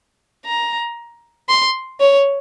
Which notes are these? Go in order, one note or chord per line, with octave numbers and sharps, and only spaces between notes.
A#5
C6
C#5